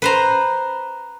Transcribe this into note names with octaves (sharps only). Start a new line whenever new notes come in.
B4 C5 A#5